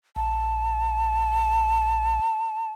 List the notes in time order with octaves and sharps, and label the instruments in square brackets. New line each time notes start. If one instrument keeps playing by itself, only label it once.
[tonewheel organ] A#1 [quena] A5